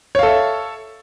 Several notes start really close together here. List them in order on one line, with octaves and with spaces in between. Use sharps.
C#5 F5 A4 E5